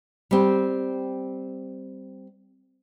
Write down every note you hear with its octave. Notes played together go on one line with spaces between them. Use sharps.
G3 C4